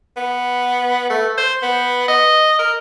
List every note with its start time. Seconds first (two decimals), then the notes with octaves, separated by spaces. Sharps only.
0.17 B3
1.10 A3
1.37 C5
1.63 B3
2.08 D#5
2.59 A#4